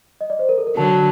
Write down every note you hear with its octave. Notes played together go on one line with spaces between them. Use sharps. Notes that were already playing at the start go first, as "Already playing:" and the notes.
D#5
D5
C5
A#4
A4
A#4
D3 F#3 A5